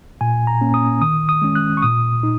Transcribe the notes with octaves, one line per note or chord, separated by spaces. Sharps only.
A#2 G#5
A#5
A#3 C#4
D#6
D#3 D#6
D#6
G#3 C#4
F#6
C#6
A#2 D#6
D#4